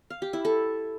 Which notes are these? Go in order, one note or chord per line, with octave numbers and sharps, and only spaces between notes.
F5
G4
E4
A4